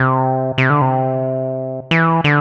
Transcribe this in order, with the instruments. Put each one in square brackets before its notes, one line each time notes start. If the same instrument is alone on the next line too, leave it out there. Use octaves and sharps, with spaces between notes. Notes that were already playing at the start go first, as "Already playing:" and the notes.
Already playing: [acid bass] C3
C3
D3
C3
E3
D3